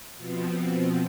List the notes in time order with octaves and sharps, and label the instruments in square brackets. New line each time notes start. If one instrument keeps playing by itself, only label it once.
[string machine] B2 F3 B3 C4